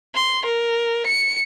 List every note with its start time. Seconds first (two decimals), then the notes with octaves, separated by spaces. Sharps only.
0.14 C6
0.45 A#4
1.06 C#7